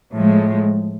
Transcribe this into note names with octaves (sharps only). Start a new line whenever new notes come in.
A2 F3 G#3